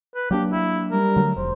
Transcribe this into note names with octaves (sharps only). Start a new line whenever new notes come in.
B4
F#3 A#3 D4 G4
E4
G3 A#4
D3 F#3 A3
F1 C5